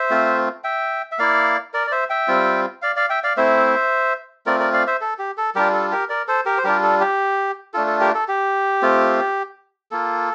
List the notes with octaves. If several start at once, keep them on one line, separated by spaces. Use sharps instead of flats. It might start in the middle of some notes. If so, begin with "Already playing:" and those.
Already playing: C5 E5
A3 C4 F4
E5 G5
E5
A#3 E4 D5 F5
A#4 D5
D5
C5 E5
E5 G5
G3 C4 F4
D5 F5
D5 F5
E5 G5
D5 F5
A3 C4 E4 C5 E5
A3 C4 F4 A#4 D5
A#4 D5
D5 F5
C5 E5
A4
G4
A4
G3 D4 F4 G4 A#4
A4
G4 A#4
A#4 D5
A4 C5
G4 A#4
C5
G3 D4 F4 G4 A#4
A4
G4
A3 D4 F4 A4
A4
G4 A#4
A4
G4
A3 C4 F4
A#3 F4 A4